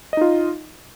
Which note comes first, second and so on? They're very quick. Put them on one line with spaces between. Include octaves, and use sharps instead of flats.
D#5 D#4 F4